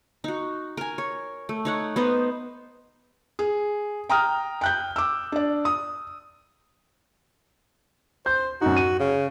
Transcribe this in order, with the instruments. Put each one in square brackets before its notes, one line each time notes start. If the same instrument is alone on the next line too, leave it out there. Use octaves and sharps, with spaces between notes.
[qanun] D#4 F#4
A#4 G#5
C#5
A3
D#4 C#5 F#5
B3 D#4 C5 D#5
[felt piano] G#4
G5 A#5 D#6 F6
G5 F#6 G6
D6 E6
D4 D5
D#6
[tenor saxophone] C5 [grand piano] G6
[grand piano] F#2 D#4 [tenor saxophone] F#4
[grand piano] D#7
[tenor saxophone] C#3